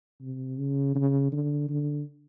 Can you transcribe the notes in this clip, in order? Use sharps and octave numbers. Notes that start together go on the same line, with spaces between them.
C3
C#3
C#3
D3
D3